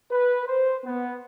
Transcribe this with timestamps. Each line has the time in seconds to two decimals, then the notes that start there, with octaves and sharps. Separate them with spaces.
0.11 B4
0.46 C5
0.84 B3